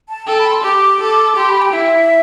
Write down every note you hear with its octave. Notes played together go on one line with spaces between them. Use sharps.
A5
A4 G5
B5
C6
G4 D6
A4
G4 C6
B5
G5
E4 E5